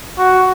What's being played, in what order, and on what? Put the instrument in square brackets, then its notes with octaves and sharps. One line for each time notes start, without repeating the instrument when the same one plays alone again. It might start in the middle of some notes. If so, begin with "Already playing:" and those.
[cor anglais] F#4